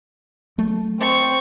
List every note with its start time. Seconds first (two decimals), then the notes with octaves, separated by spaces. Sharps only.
0.58 F#3 A3
1.00 C4 C#6